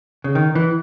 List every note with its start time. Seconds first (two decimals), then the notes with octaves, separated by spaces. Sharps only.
0.24 C#3
0.35 D#3
0.55 E3